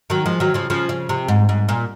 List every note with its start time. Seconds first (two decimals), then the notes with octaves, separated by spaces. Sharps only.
0.10 D#3 F#3
0.26 F3 G#3
0.40 D#3 F#3
0.54 C#3 F3
0.70 C#3 F3
0.89 C#3
1.09 C3
1.28 G#2
1.49 G#2
1.69 A#2